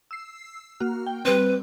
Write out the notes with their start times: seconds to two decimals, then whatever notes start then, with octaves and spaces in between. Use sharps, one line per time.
0.11 E6 C7
0.80 A#3 F#4 F6
1.07 G5
1.25 G3 C4 B4